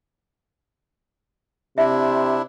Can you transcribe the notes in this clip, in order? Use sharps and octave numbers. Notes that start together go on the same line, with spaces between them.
C3 D4 E4 E5